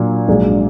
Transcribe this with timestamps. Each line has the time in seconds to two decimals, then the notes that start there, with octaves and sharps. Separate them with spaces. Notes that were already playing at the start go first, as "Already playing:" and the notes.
Already playing: A#2 F#3 A#3 D4
0.28 A#1 G#2 F#3 D4 G#4